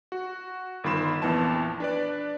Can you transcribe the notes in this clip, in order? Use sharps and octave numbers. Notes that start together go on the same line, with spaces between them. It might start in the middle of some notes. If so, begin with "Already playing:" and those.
F#4
G1 D#3 F4 B5 C6 E7
A#1 F2 E3 B3 A5 E7
D4 B4 D5